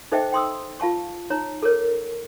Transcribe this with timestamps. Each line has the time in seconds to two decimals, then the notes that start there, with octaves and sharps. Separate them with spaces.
0.12 D#4 A4 C5 D#5 E5 G5
0.32 G5 C6 D#6 E6
0.80 F4 F5 A5 C#6
1.30 D#4 C#5 A#5
1.62 A4 A#4 C#5